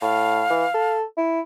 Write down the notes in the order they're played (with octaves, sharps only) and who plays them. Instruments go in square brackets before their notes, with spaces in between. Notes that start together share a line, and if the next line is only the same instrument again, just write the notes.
[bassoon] A2 [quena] F5
[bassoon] E3
A4
E4